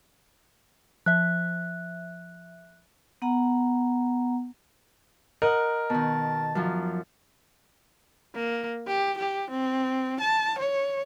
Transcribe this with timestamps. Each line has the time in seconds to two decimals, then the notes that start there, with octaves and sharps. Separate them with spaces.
1.06 F3 E5 F#6
3.22 B3 F#5 A#5
5.42 A#4 D#5 F#5
5.90 B2 D#3 A5
6.55 F#2 F3
8.35 A#3
8.87 G4
9.18 G4
9.51 C4
10.21 A5
10.59 C#5